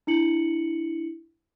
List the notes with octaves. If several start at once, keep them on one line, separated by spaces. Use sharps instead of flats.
D4 E4 C#7 F#7